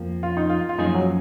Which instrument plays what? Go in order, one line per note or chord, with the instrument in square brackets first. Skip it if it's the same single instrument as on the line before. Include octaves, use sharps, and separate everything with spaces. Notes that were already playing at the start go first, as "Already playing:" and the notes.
Already playing: [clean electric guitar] F2 F3 A#3
[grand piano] F4
D#4
F4
F4
[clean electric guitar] F#2 F3 A#3 C#4 G#4 [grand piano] D#4
[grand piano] F#3